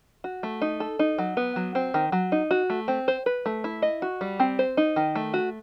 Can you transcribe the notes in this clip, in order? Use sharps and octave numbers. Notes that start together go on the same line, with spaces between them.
F#4
A3
D#4
A4
D#4
F#3
B3
F#3
C4
D#3
F#3
D#4
F#4
A3
C4
C5
B4
A3
E4
D#5
F#4
G3
C4
C5
D#4
D#3
A3
F#4